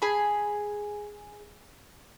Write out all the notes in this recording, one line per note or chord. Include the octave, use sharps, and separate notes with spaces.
G#4 B5